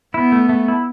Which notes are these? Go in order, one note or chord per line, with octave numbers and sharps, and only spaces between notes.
B3 E4
A3
A3
E4